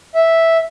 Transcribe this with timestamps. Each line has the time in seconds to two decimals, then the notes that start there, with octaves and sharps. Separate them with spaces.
0.15 E5